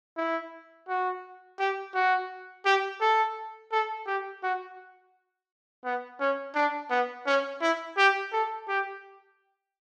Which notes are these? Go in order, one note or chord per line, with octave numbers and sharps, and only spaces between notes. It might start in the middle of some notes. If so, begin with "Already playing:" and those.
E4
F#4
G4
F#4
G4
A4
A4
G4
F#4
B3
C#4
D4
B3
C#4
E4
G4
A4
G4